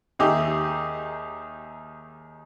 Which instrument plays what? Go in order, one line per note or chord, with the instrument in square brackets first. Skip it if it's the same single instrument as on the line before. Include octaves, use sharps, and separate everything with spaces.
[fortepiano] D#2 D#4 G4 G#4 E5